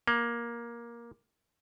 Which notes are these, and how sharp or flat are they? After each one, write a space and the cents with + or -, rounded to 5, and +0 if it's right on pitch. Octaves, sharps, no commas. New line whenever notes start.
A#3 +15